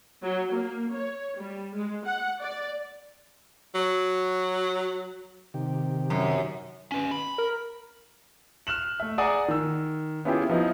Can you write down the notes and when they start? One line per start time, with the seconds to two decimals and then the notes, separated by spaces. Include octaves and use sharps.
0.23 F#3
0.53 A#3
0.94 C#5
1.38 G3
1.75 G#3
2.06 F#5
2.40 D5
3.75 F#3
5.54 C3 D#3 G4
6.10 F#2
6.92 C#4 B4
7.11 B5
7.38 A#4
8.67 F6 F#6 E7 F#7
9.00 A3 E5
9.18 G#4 D5 F#5 G#5 A#5 D#6
9.48 D#3 E6
10.25 B3 C#4 E4 F4 G4 G#4
10.49 F3 B3 D#4 E4